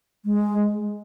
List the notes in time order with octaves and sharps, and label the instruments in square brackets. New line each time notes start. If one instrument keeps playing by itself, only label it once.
[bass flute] G#3